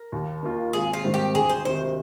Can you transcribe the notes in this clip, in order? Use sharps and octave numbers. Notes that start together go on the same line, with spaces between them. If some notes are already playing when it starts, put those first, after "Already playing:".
Already playing: A#4
D#2
D#3 A#3 F4
G#1 G#4
F4
G#2 D#3 G3 C4
G4
D2 G#4
C5
C3 D#3 C5